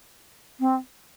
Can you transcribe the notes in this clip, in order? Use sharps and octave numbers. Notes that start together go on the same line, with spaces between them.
C4